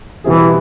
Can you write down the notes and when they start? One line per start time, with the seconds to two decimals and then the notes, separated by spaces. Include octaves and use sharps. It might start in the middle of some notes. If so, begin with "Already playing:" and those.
0.24 B2 E3 G3 C4 E4 G#4